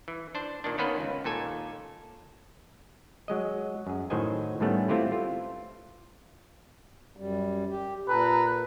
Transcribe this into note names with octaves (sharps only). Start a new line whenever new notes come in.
E3
D4 C5
A#2 D#3 D4
D#3 A#3 B3 C#4 B4 C5
C#2
D#2 A#2 A4 G#5
F#3 G#3 D#5
F#2 G#4
A2 D#3 F#3 C5 D#5 G#5
A2 D#3 G3 A3 B3 C#4
A3 C4 E4 F4 G4 B4
F4
F#2 G3
G4
A#2 A4 B4 A#5